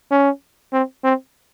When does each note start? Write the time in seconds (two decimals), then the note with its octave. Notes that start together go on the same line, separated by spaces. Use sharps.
0.11 C#4
0.73 C4
1.04 C4